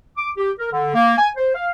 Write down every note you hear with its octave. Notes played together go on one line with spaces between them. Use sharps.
D6
G4
A#4
D3
A#3
G#5
C5
F5